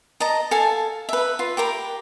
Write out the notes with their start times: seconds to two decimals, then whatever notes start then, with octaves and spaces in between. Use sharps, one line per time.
0.20 D#5 A5 A#5
0.51 A4 F5 G#5 A5
1.09 B4 E5
1.39 F4
1.57 G4 A#4 A#5 B5